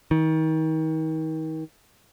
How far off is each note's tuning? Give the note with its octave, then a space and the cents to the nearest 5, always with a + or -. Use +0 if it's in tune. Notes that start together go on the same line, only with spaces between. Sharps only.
D#3 +35